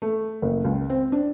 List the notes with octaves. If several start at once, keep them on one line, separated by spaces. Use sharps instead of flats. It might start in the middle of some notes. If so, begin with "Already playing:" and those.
A3
F#1
C#2
C4
D4